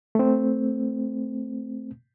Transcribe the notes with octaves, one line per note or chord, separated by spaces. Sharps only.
A3 C4